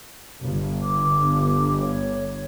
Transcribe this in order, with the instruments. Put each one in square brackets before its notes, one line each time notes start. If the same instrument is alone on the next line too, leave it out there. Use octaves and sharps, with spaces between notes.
[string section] G1
[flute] D6
C#5